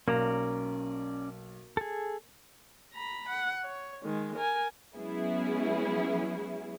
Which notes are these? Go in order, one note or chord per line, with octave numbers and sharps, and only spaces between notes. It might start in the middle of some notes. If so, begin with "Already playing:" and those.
B1 A#3 C#4 D5 A#5
G#4 A4
A#5 B5
F#5
C#5
D#3 G#3
A#4 G#5
F#3 G#3 B3 C#4 E4 G#4